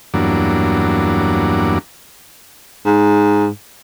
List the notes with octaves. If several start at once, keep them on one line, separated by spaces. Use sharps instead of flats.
E2 G2 F#3 A#3 D4
G#2